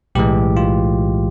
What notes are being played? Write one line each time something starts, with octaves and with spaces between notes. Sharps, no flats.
B1 A2 E3 G#3 G4
F4